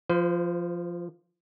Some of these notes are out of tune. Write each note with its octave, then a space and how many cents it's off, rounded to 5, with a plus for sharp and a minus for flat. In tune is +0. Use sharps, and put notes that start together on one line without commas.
F3 -5 C5 -45